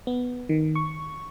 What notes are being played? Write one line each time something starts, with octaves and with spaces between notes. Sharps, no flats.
B3
D#3
C#6